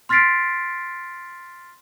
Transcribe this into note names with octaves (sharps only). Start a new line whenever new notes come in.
C6 F6 A6 B6 C7 D7